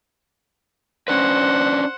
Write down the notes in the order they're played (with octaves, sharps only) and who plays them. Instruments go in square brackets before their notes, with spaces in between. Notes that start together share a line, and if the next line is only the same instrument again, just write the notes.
[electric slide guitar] C#4 D4 B4 [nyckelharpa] C5 F#5